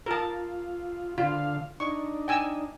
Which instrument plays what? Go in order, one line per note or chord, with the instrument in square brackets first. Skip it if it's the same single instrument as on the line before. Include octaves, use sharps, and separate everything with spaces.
[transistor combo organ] F4 [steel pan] A#4 A5
[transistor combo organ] D3 F5 [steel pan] F4
[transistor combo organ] D4 D#4 [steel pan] C#6
[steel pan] G5 G#5 E6